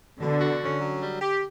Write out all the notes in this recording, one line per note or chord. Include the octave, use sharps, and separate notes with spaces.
B2 D3
F#4
C#4
F#3
G3
G4